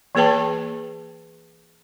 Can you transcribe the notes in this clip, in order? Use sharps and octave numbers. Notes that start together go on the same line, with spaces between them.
E3 A#3 G#4 B4 G5 A5